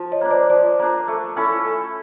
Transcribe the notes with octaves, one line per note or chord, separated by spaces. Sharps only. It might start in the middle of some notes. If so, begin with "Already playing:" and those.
Already playing: F3
C#5 D#5
A#3 D4
C5 D5
F3 C5 D5
A#3 D4
A3
C#4 E4 A4
A3